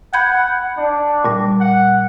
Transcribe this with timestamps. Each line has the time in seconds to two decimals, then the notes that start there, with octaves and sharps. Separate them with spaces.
0.14 F#5 B5 G6 G#6
0.77 D4
1.25 A#2 G3
1.61 F#5